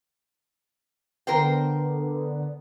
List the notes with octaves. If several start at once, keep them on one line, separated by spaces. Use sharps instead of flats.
D3 B3 A#4 C5 G5